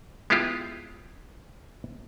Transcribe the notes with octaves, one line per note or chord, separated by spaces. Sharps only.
G#3 B3 E4 F4 G4